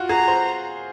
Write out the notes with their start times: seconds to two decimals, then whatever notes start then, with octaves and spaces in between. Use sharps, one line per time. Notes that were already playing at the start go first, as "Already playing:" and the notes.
Already playing: F4 F#4
0.09 G#4 A#5
0.28 C5